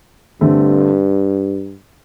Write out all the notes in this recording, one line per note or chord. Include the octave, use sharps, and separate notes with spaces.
G2 D3 A3 C4